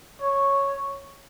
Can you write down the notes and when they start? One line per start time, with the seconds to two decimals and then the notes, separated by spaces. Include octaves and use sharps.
0.21 C#5